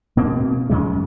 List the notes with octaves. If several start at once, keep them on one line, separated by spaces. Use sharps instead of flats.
B2 A#3 C4
F#2 C#3 F#3 G#3